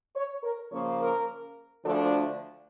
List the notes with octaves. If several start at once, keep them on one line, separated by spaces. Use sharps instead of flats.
C#5
A#4
C#3 F3 A#3 C#4 C#5
A#4
D2 D3 F3 A3 D4 A4